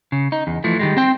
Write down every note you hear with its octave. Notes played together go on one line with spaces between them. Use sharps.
C#3
D#4
E2
E3 F3 A3
D#3 G3 G#3
C4 G5